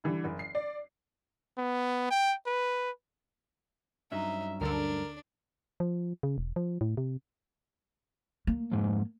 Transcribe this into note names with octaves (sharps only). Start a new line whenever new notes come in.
D3 E3 G3
F#1
C7
D5
B3
G5
B4
G2 F#3 C#4 D#4 E5
D2 D3 D4 A4 A#4
F3
C#3
E1
F3
A2
C3
A#3
F2 G#2